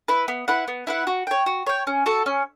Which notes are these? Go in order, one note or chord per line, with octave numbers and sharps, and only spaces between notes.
E4 B4
B3
E4 B4 F#5
B3
E4 B4 F#5
F#4
C#5 G5
F#4
C#5 G5
C#4
F#4 A4
C#4